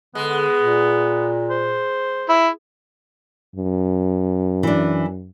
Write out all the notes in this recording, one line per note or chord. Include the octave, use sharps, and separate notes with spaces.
D3 G#3 B3
A#2
C5
E4
F#2
E3 D4